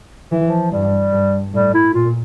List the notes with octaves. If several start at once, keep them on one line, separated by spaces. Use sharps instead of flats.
E3
F3
G2 G3
G2
A2 G3
E4
A#2 F4